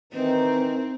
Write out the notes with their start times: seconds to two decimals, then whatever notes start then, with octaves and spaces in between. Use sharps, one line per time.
0.13 D#3 E3 C4 D#4